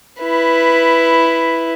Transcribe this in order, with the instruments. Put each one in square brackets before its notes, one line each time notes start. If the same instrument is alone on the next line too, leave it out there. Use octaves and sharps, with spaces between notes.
[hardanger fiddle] E4 B4